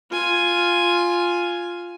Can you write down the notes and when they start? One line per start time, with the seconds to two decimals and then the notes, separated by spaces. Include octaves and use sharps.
0.11 F4 G#5